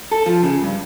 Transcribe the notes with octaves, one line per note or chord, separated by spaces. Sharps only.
A4
F3
C#3
G2